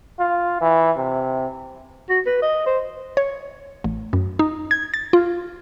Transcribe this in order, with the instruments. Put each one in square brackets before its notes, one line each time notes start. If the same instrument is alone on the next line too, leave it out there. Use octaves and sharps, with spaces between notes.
[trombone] F4
E3
C3
[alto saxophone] F#4
B4
D#5
C5
[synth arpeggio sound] C#5
A1
F#2
D#4
G#6
A6
F4